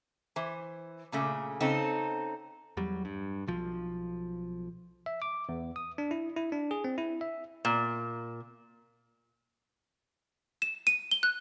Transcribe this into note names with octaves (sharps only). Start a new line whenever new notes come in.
E3 C5
A#2 C#3 A3
C#3 C4 D#4 A4
E2 F#3 G3
G2
B1 F3
E5
D6
E2
D#6
D4
E4
E4
D4
G#4
C4
E4
E5
A#2
E7
D#7
G7
F#6